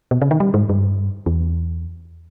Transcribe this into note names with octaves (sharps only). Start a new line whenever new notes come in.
B2
C#3
D#3
G3
G#2
G2
E2